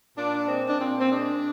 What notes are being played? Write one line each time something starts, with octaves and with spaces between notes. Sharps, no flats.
A#2 D4
G#3 C4
D4
A#2 C4
C4
G#3 D4